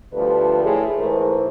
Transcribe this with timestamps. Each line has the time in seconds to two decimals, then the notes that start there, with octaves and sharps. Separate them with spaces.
0.13 D2 F3 G3 A4 B4
0.64 A2 G#4
0.97 G#2 E3 A3 A#4 C5